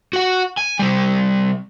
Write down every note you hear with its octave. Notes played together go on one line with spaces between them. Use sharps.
F#4 F#5
G#5
C3 G3